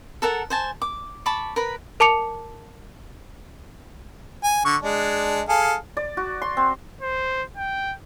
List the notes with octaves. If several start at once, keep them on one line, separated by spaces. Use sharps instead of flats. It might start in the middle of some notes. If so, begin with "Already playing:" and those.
A4 A#4 F#5 A5
C5 G#5 A5
D6
A5 B5 C#6 D6
A#4 B4 B5
A#4 A5 D6 C#7 F7
G#5
D3 C#6
G#3 D4
G#4 A4 F5
D5
F#4
C6
C4
C5
G5